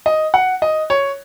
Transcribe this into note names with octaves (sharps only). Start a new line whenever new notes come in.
D#5
F#5
D#5
C#5